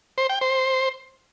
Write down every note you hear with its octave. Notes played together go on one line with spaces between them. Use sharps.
C5
G5
C5